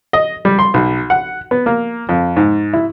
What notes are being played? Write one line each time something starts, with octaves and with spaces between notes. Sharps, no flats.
D#5
G3
C6
B1
F#5
B3
A#3
F2
G#2
E4